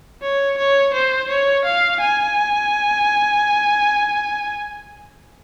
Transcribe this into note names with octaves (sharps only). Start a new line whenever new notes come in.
C#5
C#5
C5
C#5
F5
G#5